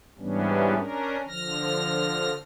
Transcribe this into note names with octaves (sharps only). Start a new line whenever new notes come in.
G#2 E3 G3 B3 C#4 D4
C#4 D4 A#4
D3 F3 F6 A#6